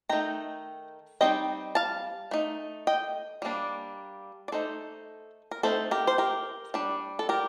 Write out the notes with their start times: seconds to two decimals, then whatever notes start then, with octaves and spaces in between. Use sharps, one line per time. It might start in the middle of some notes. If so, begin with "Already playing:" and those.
0.09 D#3 A3 D#4 G5 A#5
1.21 G3 C4 D#4 D#5 G5
1.75 F5 A5
2.31 A3 D#4
2.87 D#5 G5
3.42 G3 A#3 D4
4.48 D5
4.52 A3 D#4 A4 C5
5.51 A#4
5.63 A3 C4 D#4 A4 C5
5.91 G4 A#4
6.07 C5
6.18 G4 A#4
6.74 G3 D4
7.19 A4
7.29 G4 A#4